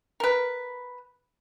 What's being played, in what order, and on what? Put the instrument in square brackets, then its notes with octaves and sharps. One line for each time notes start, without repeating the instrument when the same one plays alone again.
[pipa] A#4 B4